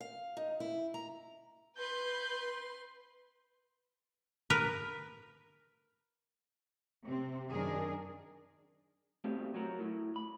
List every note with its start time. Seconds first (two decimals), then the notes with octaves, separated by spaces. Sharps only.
0.01 F5
0.37 D#4
0.60 E4
0.94 A#5
1.78 B4 C6 G6
4.50 A#4 B4
7.06 C3 C4
7.51 F#2 D#3 D4 G#4 A#4
9.24 B2 A3 C4 G4
9.54 F#3 F#4 A#4
9.80 A2
10.16 B5